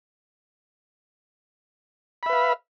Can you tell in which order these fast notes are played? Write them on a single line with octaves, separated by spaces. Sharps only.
B5 E5 B4 F5